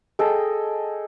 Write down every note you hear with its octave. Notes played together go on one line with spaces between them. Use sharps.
G#4 A4 D#5 G5